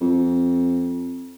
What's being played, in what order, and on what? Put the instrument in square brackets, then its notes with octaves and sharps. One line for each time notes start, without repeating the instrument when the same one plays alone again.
[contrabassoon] F2